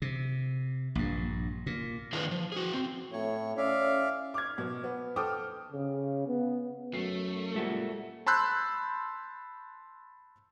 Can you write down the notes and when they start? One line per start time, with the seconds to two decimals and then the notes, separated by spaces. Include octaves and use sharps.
0.02 C3
0.95 A#1 G2
1.67 A#2
2.13 D#3 D4 E4 F4 G#4 B4
2.31 F3
2.52 F#4 G#4
2.73 C4
3.13 A2 C#5
3.57 C#4 D5 E5 F5
4.34 D6 F6 G#6
4.58 B2
4.84 B3
5.16 A4 C5 G5 D6 D#6 F6
5.72 C#3
6.27 B3
6.94 F#2 F#3 A3 C7
7.54 A#2 G3 G#3 A4 E5 F#5
8.26 A5 B5 C6 E6 F#6 G6